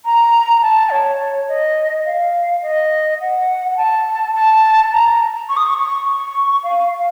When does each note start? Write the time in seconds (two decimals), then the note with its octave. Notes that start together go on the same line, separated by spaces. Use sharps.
0.05 A#5
0.62 A5
0.90 C#5
1.49 D#5
2.05 F5
2.63 D#5
3.20 F#5
3.71 F#5
3.77 A5
4.34 A5
4.92 A#5
5.49 C#6
5.57 D#6
5.65 C#6
5.78 C#6
6.06 C#6
6.64 F5
6.92 F5